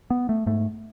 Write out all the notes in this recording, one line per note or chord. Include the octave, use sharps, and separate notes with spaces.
B3
A3
G#2 A3